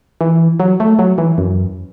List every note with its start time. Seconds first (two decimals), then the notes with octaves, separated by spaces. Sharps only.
0.21 E3
0.60 F#3
0.80 A3
0.99 F#3
1.18 E3
1.38 F#2